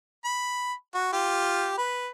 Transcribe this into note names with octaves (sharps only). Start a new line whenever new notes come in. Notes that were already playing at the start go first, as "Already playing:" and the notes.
B5
F#4
F4 G4
B4